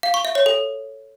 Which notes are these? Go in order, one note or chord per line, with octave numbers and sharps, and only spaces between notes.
F5
C#6
E5
C#5
A4